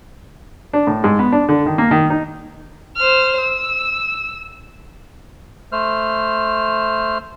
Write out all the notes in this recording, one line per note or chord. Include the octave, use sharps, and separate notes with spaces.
D4
A2
G#2
B3
D4
D3
D#3
A#3
D#3
D#4
C5 F6
E6
A3 C5 F6